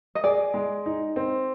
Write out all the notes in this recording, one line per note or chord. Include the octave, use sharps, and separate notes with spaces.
D#5
G#4 D5
G#3
D#4
C4